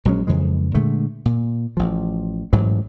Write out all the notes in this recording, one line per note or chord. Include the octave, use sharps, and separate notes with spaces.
A#1 F#3 G#3 C#4
F2 C#3 E3 G#3
A#2 D3 G#3 A3
A#2
A1 F3
A1 G#2 E3 F#3